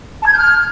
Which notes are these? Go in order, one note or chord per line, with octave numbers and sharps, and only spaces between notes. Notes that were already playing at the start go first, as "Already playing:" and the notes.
A5
G#6
G6
F6